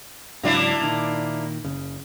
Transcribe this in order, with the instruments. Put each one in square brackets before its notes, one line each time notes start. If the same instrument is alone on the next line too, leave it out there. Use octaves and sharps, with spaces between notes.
[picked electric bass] G#2 C#3 F#3 [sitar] A#3 D4 E4
[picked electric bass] A#2 D#3
F#1 C#3